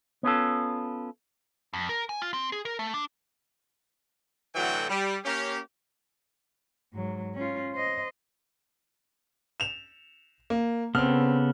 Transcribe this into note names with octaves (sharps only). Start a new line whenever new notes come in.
B3 C#4 F4 A4
F2
A#4
G#5
F4
C4
G#4
A#4
A3
D4
A2 D3 E3 F#3 F#4 G5
G3
A#3 C#4 G4
G#2 F#3
C#4 F4
C5 D#5
E7 F7
A#3
C#3 B3 C4 A4 F6